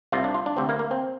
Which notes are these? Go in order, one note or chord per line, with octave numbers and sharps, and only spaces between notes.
C2 C3 F4
D4
F4
D4
D2 C3 C4
A#3
A#3
C4